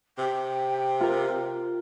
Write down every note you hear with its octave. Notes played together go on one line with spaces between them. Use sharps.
C3 G5
F4 A#4